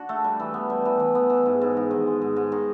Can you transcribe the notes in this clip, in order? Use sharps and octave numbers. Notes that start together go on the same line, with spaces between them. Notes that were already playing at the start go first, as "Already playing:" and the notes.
Already playing: D4 F#4
A3
G3
E3
B3
G3
E3
E3
B3
E3
G#2
G#2
G#2
D#3
G#3
G#2
G#2
D#3